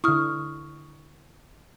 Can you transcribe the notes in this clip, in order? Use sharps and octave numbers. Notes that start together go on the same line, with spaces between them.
D3 E4 C#6 D#6 F6